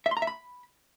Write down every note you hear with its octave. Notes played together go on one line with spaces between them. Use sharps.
E5
C6
A#5
E5
B5